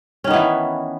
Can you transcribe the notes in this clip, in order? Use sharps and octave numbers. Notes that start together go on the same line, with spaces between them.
D#3 E3 B3 C#4